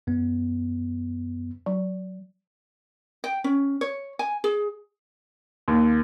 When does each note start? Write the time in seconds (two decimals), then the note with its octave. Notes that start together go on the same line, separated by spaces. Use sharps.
0.07 F#2 B3
1.66 F#3
3.24 G5
3.44 C#4
3.81 C#5
4.19 G#5
4.44 G#4
5.68 D#2